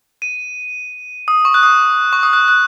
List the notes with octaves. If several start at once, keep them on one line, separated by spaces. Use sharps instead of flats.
D#7
D#6
C#6
F#6
D#6
C#6
D#6
F#6
F#6